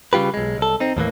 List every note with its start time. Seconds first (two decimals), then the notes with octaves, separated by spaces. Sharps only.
0.13 C#3 G3 F4 G4 B4
0.34 B1 G#3
0.58 C2 A4
0.80 C4 D#4
0.97 D#2 A2 E3 A#3